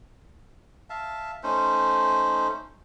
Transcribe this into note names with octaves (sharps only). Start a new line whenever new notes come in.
E5 F5 A5
A3 C#4 D#4 C5